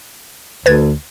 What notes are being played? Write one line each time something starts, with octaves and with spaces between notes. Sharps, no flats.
D2 B4 G#6 A6